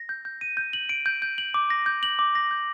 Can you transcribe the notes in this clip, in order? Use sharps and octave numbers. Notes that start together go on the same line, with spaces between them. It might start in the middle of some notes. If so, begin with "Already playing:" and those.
Already playing: A#6
G6
G6
D#7
G6
F#7
D7
G6
G6
F#7
D6
A#6
G6
F#7
D6
A#6
G6